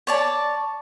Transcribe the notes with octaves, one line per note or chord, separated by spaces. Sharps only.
C#5 D5 A5